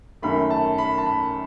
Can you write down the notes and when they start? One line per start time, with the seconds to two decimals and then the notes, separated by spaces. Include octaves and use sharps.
0.22 F#2 D#3 A3 B5
0.50 A5
0.78 B5
0.98 A5
1.06 B5